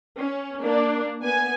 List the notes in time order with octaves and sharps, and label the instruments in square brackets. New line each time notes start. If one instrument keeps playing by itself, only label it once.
[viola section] C#4
A#3 D4
B3 G#5